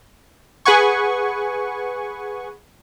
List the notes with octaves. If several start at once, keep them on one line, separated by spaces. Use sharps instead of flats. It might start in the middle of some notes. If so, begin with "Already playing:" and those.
G#4 B4 F#5 G#5 C#6